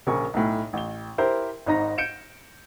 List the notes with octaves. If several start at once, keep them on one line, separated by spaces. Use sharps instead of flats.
A#1 C#3 G#4 A#4 C#6
B1 A2
A1 G7
E4 G4 A#4 C5
G#1 G#2 D#4 D#5 A#5 A#6
G6 C#7 D7 E7